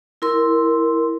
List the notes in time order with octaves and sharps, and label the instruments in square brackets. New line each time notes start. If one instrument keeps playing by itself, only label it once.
[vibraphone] E4 A#4 C6